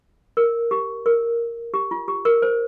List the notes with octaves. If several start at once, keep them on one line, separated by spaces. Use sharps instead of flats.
A#4
G4
A#4
G4
F4
G4
A#4
C5